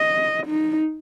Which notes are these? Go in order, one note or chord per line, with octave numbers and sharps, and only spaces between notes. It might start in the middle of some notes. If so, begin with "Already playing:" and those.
Already playing: D#5
D#4